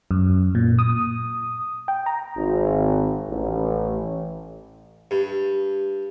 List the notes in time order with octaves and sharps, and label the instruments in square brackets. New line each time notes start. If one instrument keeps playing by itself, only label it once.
[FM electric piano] F#2
A#2
D#6
G5
A#5
[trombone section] G#1
A1
[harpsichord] G2